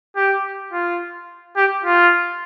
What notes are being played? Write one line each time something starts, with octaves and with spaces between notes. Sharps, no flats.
G4
F4
G4
F4